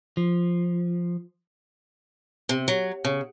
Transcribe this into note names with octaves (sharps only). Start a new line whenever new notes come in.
F3
C3
F#3
C#3